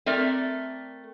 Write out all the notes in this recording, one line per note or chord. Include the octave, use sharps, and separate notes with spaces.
A3 C4 A#4 D5